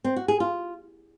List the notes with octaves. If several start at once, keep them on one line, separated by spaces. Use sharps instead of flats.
C4
F#4
G#4
F4